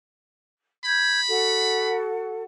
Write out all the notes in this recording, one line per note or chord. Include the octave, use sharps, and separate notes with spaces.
B5 G6 G#6
F#4 A4 F#5